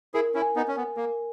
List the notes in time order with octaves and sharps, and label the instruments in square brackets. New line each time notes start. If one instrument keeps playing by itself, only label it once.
[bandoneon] E4 G#4 [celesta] A#4
[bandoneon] C#4 E4
[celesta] G#5
[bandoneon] B3 D#4
[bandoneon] C#4 [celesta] G#5
[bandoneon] B3
[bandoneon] A#3 [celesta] A#4